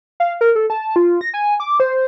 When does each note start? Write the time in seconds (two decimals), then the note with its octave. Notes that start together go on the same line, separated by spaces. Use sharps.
0.20 F5
0.41 A#4
0.56 A4
0.70 A5
0.96 F4
1.21 A#6
1.34 G#5
1.60 D6
1.80 C5